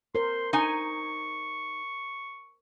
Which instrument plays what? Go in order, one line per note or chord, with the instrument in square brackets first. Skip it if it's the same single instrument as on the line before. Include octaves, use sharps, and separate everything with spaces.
[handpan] A#4 C5 [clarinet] C6
[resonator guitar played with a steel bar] D#4 G#5 [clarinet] C#6